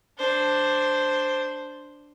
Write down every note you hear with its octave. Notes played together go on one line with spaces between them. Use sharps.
D4 C5